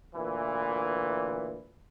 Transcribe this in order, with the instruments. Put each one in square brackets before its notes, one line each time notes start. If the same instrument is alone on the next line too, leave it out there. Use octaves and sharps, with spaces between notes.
[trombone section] D2 A#2 E3